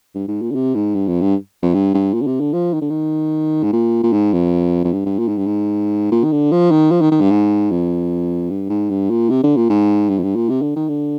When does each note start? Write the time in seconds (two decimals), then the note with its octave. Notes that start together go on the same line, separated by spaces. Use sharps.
0.15 G2
0.28 G#2
0.42 A#2
0.51 D3
0.55 C3
0.75 G#2
0.95 G2
1.07 F2
1.21 G2
1.63 F2
1.74 G2
1.94 G2
2.14 A#2
2.22 D3
2.27 C3
2.40 D3
2.53 F3
2.74 D#3
2.82 D3
2.90 D#3
3.63 G#2
3.73 A#2
4.03 A#2
4.13 G#2
4.33 F2
4.84 F2
4.93 G2
5.06 G2
5.19 A#2
5.28 G#2
5.38 G2
5.46 G#2
6.12 A#2
6.24 D#3
6.32 D3
6.52 F3
6.71 D#3
6.91 F3
7.01 D#3
7.12 D#3
7.21 G2
7.31 G#2
7.71 F2
8.50 G2
8.70 G#2
8.90 G2
9.10 A#2
9.30 C3
9.43 D3
9.57 A#2
9.70 G#2
10.09 G2
10.18 F2
10.23 G2
10.36 A#2
10.50 C3
10.62 D3
10.76 D#3
10.89 D3